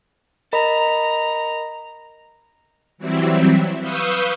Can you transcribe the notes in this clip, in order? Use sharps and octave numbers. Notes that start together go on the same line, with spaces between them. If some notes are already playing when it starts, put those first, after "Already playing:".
A#4 D#5 A#5 B5
E3 F#3 G3 C4 E4
B4 F5 C#6 D#6 E6 G6